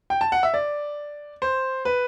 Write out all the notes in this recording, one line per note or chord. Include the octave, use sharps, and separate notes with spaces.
G5
A5
F#5
E5
D5
C5
B4